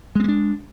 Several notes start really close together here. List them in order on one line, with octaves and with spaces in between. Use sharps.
G#3 C4 A#3 D4